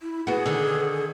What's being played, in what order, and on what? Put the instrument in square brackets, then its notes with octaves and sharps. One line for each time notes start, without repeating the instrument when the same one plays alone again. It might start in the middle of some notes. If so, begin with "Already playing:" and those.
[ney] E4
[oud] B3 F#4 [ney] G#4
[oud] D3 D#3